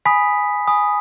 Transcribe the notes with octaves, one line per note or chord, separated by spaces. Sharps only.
G#5 B5 D#6 B6
G#5 B5 D#6